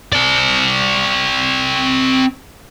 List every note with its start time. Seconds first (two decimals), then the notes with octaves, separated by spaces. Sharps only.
0.13 C4 D5